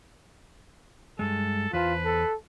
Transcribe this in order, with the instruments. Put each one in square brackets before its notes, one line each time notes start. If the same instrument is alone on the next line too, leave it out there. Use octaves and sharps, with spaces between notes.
[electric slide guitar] G2 G#3 [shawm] A4
[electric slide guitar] E2 C5 A5 [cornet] F4 [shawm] B4
[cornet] A4